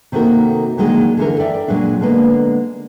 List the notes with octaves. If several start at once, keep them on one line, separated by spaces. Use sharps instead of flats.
C3 D#3 A3 A#3 F#4 A#4
A#2 D3 D#3 F#3 G#3 A#3
D3 E3 A4 A#4
D5 E5 G5
A#2 F#3 G#3 D4
D3 G#3 A#3 B3 D4